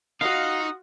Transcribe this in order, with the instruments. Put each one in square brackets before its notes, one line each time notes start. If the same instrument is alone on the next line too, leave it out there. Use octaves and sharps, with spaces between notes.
[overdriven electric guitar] D#4 [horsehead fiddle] F4 F#4 [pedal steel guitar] F5 [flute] D#6